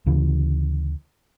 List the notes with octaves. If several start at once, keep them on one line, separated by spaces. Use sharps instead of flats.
D2 C#3 E3